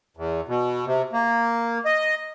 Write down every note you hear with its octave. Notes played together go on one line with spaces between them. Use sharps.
E2
B2
C3
A#3
D#5